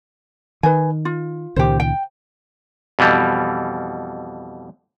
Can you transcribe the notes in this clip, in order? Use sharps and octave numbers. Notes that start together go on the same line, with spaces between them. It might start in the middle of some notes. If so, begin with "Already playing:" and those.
D#3 B4 G#5
F4
C#2 A#2 D#3 G4 C5
G5
F2 B2 E3 G3